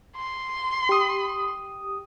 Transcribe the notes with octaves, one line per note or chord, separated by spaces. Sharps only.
C6
G4 D#6